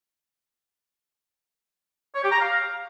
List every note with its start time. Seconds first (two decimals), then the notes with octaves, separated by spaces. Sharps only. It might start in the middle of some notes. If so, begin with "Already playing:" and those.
2.15 C#5
2.24 G4
2.32 A#5
2.40 F5